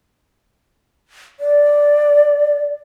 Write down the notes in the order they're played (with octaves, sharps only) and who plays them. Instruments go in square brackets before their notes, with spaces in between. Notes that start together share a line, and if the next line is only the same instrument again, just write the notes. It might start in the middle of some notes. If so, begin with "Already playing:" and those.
[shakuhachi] D5